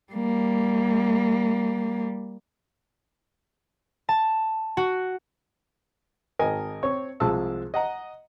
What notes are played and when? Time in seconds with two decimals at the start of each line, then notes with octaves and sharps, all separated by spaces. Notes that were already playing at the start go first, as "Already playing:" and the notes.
0.13 G3 A#3
4.09 A5
4.77 F#4
6.39 G#1 A#4 D#5 G#5
6.83 C4 C#5 C#6
7.20 C2 F3 G#3 A5 E6
7.74 D#5 F#5 A#5